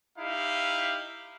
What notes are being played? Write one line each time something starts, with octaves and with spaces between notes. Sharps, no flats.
D#4 E4 G4 F5